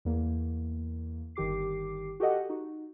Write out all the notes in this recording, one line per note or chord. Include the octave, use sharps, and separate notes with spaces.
E2 A#3
G1 D#3 G4 D6 C7
F#4 G4 A4 D#5 F#5
D#4 F#4